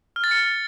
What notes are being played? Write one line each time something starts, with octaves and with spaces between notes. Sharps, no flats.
F6
A6
C#7